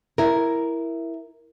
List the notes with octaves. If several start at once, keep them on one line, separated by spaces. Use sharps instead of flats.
E4 A#4